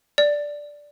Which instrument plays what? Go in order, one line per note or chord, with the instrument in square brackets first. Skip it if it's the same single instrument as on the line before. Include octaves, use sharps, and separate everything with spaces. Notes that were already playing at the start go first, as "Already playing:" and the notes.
[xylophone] D5